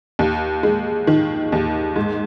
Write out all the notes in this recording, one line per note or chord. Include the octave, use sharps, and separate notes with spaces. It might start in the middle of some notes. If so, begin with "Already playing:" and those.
D#2
G#3
D#3
D#2
G#2